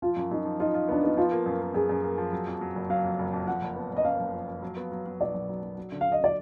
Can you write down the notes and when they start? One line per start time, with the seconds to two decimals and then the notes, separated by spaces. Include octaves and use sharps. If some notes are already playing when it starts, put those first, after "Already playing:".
0.02 F3 F4
0.16 F#2
0.31 F#2 D#4
0.45 F3
0.60 D#4 F4
0.74 F4
0.89 B3 D4
1.03 B3 D#4
1.17 F3 F4
1.32 A#3
1.46 F#2
1.61 A#3
1.74 F#2 G#4
1.89 F#2
2.04 A#3
2.18 F3
2.33 F#3
2.47 F2
2.61 F#3
2.75 F#1
2.90 F#3 F5
3.04 F2
3.19 F#1
3.33 F2
3.47 F3 F#5
3.62 F#1
3.76 B3
3.91 F#1
3.97 D#5
4.04 F#2 F5
4.19 F#1
4.34 F3
4.48 F3
4.63 F#3
4.77 B3
4.92 F#3
5.06 F#3
5.20 B1 D5
5.34 B1
5.49 F#3
5.63 F#3
5.78 F#3
5.92 D3
6.01 F5
6.07 D3
6.12 D#5
6.21 D3 D5